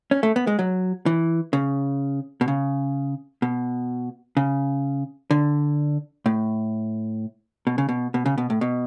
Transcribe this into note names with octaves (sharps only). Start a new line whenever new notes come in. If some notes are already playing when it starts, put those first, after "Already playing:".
C#4
A3
B3
G#3
F#3
E3
C#3
B2
C#3
B2
C#3
D3
A2
B2
C#3
B2
B2
C#3
B2
A2
B2